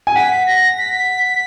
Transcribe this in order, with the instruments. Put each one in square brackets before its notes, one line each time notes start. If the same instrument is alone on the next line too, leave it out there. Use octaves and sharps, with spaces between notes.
[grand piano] G#5
[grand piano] F#5 [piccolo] B6
[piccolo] A#6
B6